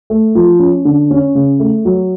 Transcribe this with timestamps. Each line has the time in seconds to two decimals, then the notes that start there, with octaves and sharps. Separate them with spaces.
0.10 A3
0.35 F3
0.59 C#4
0.85 D3
1.11 C#4
1.35 C#3
1.60 A3
1.85 F#3